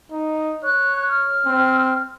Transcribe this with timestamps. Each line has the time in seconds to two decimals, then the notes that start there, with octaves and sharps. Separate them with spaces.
0.12 D#4
0.64 C#5 F#6
1.09 F6
1.46 C4